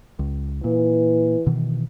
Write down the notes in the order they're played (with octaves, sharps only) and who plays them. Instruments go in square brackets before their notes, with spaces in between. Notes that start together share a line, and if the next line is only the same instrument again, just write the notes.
[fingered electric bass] C#2
[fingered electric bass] A#2 [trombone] E3
[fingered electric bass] B2 D#3 E3